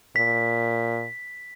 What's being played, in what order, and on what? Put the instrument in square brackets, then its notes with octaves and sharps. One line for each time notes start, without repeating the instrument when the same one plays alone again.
[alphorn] A#2 [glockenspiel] B6